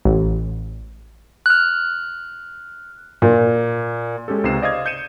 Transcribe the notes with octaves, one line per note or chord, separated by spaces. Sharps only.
A1
F6 F#6
A#2
G#3 C#4 G4 A4
C#2 C3 D#4 C7 E7
C5 D5 D#5 F5 D#6 G#6
G6 C#7 D#7 E7